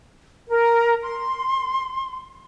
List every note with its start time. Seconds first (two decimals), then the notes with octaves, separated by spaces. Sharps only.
0.49 A#4
1.02 C6